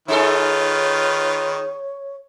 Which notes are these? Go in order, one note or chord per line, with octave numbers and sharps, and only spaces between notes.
D#3 D#4 F4 G#4 A4 B4 C#5